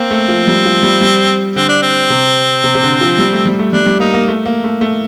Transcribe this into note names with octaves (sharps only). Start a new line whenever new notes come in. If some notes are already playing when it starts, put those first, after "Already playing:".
Already playing: A#3 C4
A3
F3
G3
F3
G3
G3
D3 C4
D4
C4
C3
C3
C3
D3
F3
G3
A3
G3
A3
G3 D4
G3
A#3 D#4
A#3
A3
A#3
A3
A3